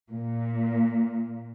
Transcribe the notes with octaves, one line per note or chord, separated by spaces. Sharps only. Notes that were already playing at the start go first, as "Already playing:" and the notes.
A#2